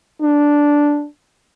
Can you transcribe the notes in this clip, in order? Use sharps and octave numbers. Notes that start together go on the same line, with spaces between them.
D4